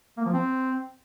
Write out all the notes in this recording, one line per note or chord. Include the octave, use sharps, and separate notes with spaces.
A#3
F3
C4